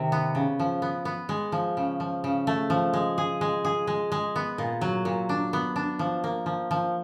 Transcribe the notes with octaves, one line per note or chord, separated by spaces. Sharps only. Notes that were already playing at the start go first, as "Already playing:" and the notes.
Already playing: C3 D#3
B3
C#3
F3
B3
B3
G#3
F3
C#3
F3
C#3
A3
F3
G#3
G#4
G#3
G#4
G#3
G#3
B3
A#2
F#3
A#2
D4
B3
D4
F3
A#3
F3
F3